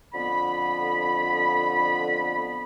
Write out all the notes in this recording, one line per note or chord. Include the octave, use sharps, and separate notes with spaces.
F2 D3 B3 B5